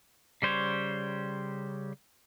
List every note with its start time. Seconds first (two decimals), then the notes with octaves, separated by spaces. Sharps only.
0.42 C#3 G3 C5 C#5